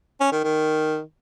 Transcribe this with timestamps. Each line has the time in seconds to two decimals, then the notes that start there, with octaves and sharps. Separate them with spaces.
0.20 C#4
0.32 D#3
0.44 D#3